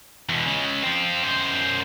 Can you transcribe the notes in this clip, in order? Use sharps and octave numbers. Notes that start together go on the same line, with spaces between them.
E2 B2
C#3 G#3
F3 C4
F#2 C5